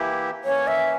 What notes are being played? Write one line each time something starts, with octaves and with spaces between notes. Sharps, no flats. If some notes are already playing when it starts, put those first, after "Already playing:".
Already playing: E3 A#3 E4 G4
E3 A#3 C#4 C#5
E5